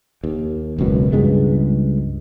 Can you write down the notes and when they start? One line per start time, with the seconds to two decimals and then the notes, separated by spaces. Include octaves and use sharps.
0.24 D#2
0.79 E1 C#2 F#2 B2
1.12 C#2 G2 G#3 B3